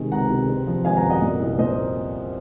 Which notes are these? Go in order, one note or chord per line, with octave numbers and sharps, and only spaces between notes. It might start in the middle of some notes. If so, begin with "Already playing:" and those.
Already playing: C3 D#3 G#3
C#2 F#5 A#5
C3
C4
F3
G#1 F5 G#5
F#5 A#5
F#2
D#5 F#5
A#2
C2
A#2 C5 D#5